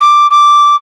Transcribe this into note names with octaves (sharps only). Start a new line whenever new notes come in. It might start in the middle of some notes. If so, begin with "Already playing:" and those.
D6
D6